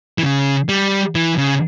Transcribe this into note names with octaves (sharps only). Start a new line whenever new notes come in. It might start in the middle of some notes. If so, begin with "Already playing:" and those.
E3
C#3
G3
E3
C#3